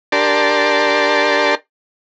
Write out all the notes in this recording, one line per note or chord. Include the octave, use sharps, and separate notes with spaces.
D4 G4 A#4 D5 A5 C6